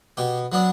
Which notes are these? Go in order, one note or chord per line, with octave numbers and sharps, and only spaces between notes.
B2 G4
F#3 B3 D4